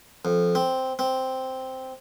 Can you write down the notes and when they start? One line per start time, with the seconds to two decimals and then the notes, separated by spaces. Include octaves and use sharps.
0.25 F2
0.55 C4
0.99 C4